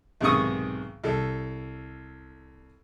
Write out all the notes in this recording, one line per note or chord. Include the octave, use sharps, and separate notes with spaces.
B1 G#2 C3 D#3 C#6 D#6
C2 A4